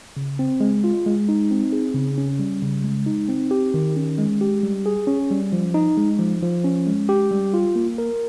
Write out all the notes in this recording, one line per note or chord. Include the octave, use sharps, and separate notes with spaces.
C#3
C4
G#3
F4
G#3
D#4
C4
G#4
C#3
C#4
G3
C#3
G#3
D#4
C4
G4
D#3
C#4
G#3
G4
G3
G#4
C#4
G3
F3
D#4
G#3
F3
F3
C#4
G#3
G4
G3
F4
A#3
A#4